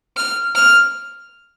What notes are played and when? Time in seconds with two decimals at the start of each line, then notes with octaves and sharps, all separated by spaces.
0.17 F6
0.55 F6